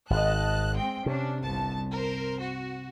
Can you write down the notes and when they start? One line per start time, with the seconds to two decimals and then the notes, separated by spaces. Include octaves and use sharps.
0.10 G#1 D#5 A5 F#6
0.76 G#3 C4 G5
1.06 C3 C#4 D4
1.42 G1 C2 A5
1.92 A#4 C5
2.41 F#4